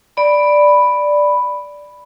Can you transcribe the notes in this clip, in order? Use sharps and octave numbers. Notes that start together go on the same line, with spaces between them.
D5 B5